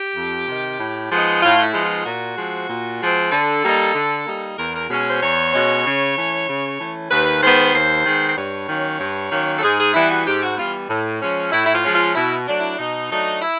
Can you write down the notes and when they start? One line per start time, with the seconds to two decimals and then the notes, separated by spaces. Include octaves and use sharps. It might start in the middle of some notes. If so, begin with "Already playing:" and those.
Already playing: G4
0.16 F2
0.47 C3 D#3
0.79 A2
1.11 F3 G#3 B3 D#4
1.42 A2 F4
1.63 E4
1.74 F3 G#3 B3 D#4
1.85 F4
2.06 A#2 F#4
2.37 F3 G#3 C4
2.68 A#2
3.01 F3 G#3 C4
3.32 D3 A4
3.63 G3 A#3 D#4
3.95 D3
4.26 G3 A#3 D#4
4.58 E2 A#4
4.74 A#4
4.90 B2 G#3 C#4
5.05 C5
5.21 E2 C#5
5.53 B2 G#3 C#4
5.85 C#3
6.16 E3 A3 C#4
6.48 C#3
6.79 E3 A3 C#4
7.10 D#2 B4
7.42 D#3 G#3 B3 C5
7.73 D#2 C5
8.05 D#3 G#3 B3
8.29 C5
8.37 G2 C#5
8.68 D#3 F#3 A#3 C#4
9.00 G2
9.31 D#3 F#3 A#3 C#4
9.56 A4
9.63 G#2 G#4
9.80 G#4
9.94 E3 G3 B3 E4
10.10 F#4
10.26 G#2 G4
10.43 F#4
10.58 E3 G3 B3 F4
10.89 A2
11.22 F3 G#3 C#4
11.52 A2 E4
11.66 E4
11.73 F4
11.84 F3 G#3 C#4
11.94 F4
12.15 B2 E4
12.48 F#3 A3 D4
12.58 E4
12.78 B2 D#4
13.10 F#3 A3 D4 D#4
13.41 E4